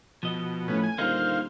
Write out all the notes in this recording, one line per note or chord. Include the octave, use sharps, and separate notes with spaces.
B2 F3 D#5
A2 B3 C#4
G#5
D#1 D3 A#3 D#4 C5 F5